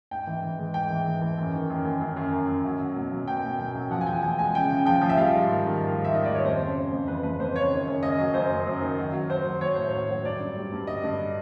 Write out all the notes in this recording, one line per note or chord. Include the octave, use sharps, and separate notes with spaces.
G#2 G5
E3
E3
G#3
G#2 G5
E3
E3
E3
F#2
D#3
F#2
F#2
F#2
F#2
F#2
F#2
F#3
F#3
B2
F#3
B2 G5
B2
F#3 G5
F#3
F3 F#5
G#5
E2 G5
F3 G#5
G#3 G#5
C#3 G5
C#3
F3 G5
F3
E5
G3 F5
G#2
D#3
D#3
G#2
G#2
E5
D#3 D#5
G3 D5
C#5
F2 C5
C#3
C#3
F2
E3 B4
F2 B4
F2 C5
C#3 C#5
D#3
F#2
F#2 D#5
F#3
F#2 C5
F#2
F#2
D#3
F#3
F#3
F#3 C5
F#3
F#3 C#5
A2 C5
F#3 C#5
F#3
G2 D5
G2
G3
G2
D3 D#5
G2